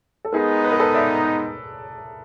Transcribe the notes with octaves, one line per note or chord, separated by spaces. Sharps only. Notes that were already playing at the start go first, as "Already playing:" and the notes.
A4
G#3 B3 D#4 G#4 A#4
B4
A#4
A4 B4
D5 E5